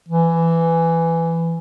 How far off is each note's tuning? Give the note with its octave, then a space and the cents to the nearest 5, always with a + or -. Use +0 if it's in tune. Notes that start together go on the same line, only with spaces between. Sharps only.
E3 +10